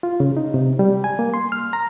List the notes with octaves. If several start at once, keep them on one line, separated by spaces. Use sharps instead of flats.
F4
C#3
D#4
C3
G3
G#5
A#3
C6
F6
A#5